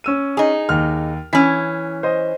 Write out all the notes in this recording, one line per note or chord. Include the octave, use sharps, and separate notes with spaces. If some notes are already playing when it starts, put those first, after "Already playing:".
C#4 E6 D#7
D#4 G#4
D#2 F6
E3 C#4 G#5 B6
C5 D#5